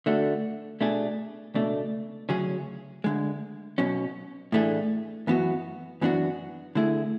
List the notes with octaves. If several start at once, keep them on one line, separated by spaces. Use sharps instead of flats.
D3 A3 D4 F#4
B2 A3 D4 G#4
C#2 B2 A3 D4
D2 C#3 F#3 C#4 G#4
D2 D3 G#3
B1 B2 F#3 C#4
A2 E3 A3 D4 G#4
F#2 E3 B3 F#4
F#2 E3 B3 D4 F#4
D3 A3 E4 G#4